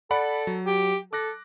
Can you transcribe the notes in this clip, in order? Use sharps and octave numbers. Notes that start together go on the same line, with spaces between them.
A4 D5 F#5 B5
F#3
G4
A4 D6 F#6 A#6